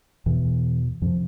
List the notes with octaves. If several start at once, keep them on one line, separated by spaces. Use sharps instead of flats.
E2 B2 E3
F2 C3 F3